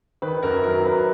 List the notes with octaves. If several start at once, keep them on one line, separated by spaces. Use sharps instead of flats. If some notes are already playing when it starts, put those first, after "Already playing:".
D#3 B4
F#2 A#4
F#3 A#4
F#2 B4